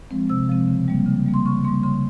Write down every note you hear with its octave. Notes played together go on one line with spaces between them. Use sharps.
F3 G#3 C4
C3 E6
F3 G#3 C4
C#3
G3 A#3
C#3
G3 A#3
C6
C#3 C#6
G3 A#3 C6
C#3 C6